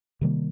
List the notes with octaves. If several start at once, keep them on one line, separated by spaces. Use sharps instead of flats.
C3 D#3 G3 A#3